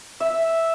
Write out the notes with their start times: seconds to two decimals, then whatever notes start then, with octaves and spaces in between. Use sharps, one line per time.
0.20 E5